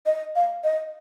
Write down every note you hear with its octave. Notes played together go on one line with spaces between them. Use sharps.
D#5
F5
D#5